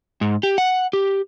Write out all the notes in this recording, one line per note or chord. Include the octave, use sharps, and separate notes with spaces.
G#2
G4
F#5
G4